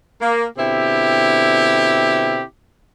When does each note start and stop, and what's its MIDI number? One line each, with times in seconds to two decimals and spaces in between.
0.21 0.45 58
0.57 2.42 47
0.57 2.42 50
0.57 2.42 60
0.57 2.42 64
0.57 2.42 67